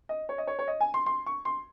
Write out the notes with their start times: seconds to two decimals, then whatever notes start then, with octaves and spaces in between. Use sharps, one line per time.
0.09 D#5
0.29 C#5
0.38 D#5
0.47 C#5
0.59 C#5
0.68 D#5
0.81 G#5
0.94 C6
1.06 C6
1.26 C#6
1.45 C6